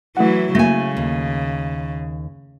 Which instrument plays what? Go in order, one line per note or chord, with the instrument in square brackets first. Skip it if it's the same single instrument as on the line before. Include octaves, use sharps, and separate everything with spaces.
[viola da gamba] E3 F#3 E4 [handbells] A3 F#5
[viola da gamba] C#3 [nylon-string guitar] A3 G#5 [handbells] A#3 A#6
[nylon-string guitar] D#2